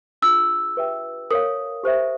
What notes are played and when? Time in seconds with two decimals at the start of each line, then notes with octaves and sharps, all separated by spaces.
0.22 D4 F4 G#4 E6
0.77 G4 B4 E5 G5
1.31 A#4 C#5 F5 D#6
1.83 G4 C5 E5